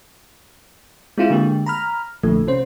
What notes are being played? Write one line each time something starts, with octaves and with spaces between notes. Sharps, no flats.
G#3 C4 E4 F4
D3 G#3 A#3 G4
A#5 B5 F6
A#1 A#2 D3 F3 A3
C3 C#4 C5